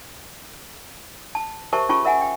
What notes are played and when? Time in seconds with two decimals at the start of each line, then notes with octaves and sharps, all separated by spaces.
1.35 A5
1.73 G4 A#4 C5 E5 A5 C#6
1.89 C#4 F4 G4 G#4 A5 C#6
2.05 A#4 E5 F#5 G#5
2.21 G5